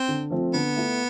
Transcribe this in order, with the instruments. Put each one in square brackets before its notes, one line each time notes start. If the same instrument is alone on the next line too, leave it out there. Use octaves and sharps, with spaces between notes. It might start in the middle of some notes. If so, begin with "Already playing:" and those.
Already playing: [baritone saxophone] C4
[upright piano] D3
F3 A3 C4 F4
[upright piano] D3 [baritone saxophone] B3
[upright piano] A3 E4